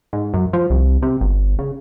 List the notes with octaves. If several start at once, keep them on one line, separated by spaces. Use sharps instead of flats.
G#2
F#2
F3
C2
C3
G1
C#3